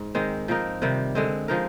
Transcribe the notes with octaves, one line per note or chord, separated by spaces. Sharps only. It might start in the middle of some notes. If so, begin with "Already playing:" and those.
Already playing: G#2
D#3 G#3 C4
F3 C4 D#4 A#4
C3 D#3 G3
D3 G#3 C4
F3 G#3 D#4 A#4